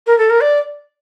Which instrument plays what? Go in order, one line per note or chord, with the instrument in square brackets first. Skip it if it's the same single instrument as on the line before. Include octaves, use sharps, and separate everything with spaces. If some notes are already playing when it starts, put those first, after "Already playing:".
[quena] A#4
A4
A#4
D5